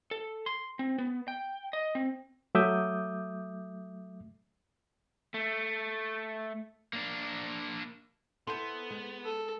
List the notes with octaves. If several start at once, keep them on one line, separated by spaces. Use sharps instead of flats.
A4
C6
C4
B3
G5
D#5
C4
F#3 A3 E5 D6 D#6 G6
A3
A#3 D4
B3 E4 A4 C5 C6
G#3
A4